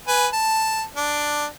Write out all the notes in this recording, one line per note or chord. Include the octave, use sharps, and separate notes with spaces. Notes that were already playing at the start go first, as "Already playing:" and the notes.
B4 G#5
A5
D4